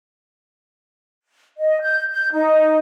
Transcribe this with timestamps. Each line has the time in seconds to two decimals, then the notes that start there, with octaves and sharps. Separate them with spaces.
1.58 D#5
1.81 G6
2.11 G6
2.33 D#4